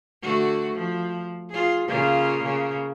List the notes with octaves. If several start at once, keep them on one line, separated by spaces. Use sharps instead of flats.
D3 A3 F#4
F3
F4 G#4
C#3 A#3 F4
C#3 A#3